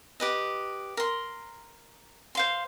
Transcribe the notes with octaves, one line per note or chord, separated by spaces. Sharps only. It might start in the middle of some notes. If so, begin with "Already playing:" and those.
G4 B4 D#5
A#4 C6
C5 F5 C6